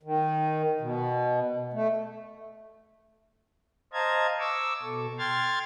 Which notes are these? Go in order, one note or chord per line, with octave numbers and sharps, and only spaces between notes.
D#3
B2
A3
C5 D#5 F5 A5 A#5 G#6
C#6 D6 E6
B2 A4
G5 C6 F6 G#6 A6